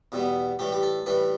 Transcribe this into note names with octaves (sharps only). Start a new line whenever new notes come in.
E2 B2 G3 B3
A2 E3 G3 G4
G4
A4
A2 E3 G3 B4